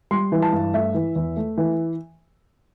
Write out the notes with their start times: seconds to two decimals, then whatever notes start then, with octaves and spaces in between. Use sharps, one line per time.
0.11 G3 C6
0.32 E3
0.42 A5
0.53 G2
0.74 A3 E5
0.94 E3
1.16 E2
1.37 A3
1.58 E3